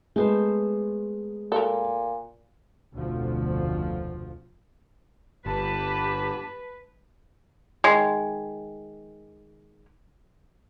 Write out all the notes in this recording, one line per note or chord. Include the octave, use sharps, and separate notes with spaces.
G#3 A3 B3 C5
A#2 A4 A#4
F1 D2 B2 F3
G1 G4 B4 A5
D#3 G#3